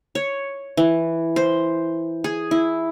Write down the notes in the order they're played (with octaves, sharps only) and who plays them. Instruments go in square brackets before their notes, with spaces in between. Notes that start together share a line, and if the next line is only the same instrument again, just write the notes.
[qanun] C#5
E3
C5
G#4
E4